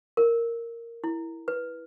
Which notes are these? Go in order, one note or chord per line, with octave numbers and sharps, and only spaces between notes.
A#4
E4
B4